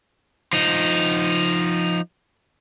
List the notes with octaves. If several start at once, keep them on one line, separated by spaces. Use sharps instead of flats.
F3 D#4